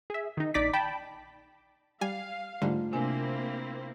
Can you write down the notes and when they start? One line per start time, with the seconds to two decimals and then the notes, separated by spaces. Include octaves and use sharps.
0.10 G#4 E5
0.37 D#3 D#4
0.54 A#1 D#4 D5 D6 B6
0.73 G5 A5 B5
2.01 G3 F5 G#5
2.62 G#2 D3 G3 A3 F4
2.93 C3 A#3 C4 D4 E4 G#5